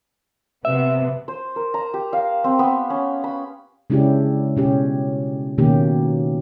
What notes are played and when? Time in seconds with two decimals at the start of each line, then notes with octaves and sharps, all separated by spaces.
0.65 C3 B3 E5
1.28 C5
1.56 A#4
1.74 A#5
1.94 G4
2.13 F5
2.44 C4
2.59 B3
2.90 C#4
3.24 B5
3.90 C#3 G#3 C#4 D4 E4 G4
4.56 B2 C#4 G4
5.58 B2 D#3 A#3 C#4 G4